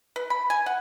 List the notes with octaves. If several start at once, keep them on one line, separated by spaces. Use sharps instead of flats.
B4
B5
G#5
F#5